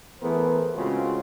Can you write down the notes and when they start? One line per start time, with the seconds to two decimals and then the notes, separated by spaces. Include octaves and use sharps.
0.21 E3 A3 B3 G#4 A#4 C5
0.75 A2 C#3 G#3 C4 F4 F#4